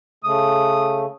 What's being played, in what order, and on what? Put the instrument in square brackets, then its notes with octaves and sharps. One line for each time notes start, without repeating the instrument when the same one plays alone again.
[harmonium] C#3 A3 [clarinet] D#6